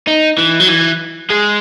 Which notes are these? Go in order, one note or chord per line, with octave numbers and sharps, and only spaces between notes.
D#4
E3
F#3
E3
G#3